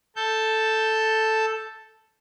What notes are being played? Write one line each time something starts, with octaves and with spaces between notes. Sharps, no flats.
A4 A5 G6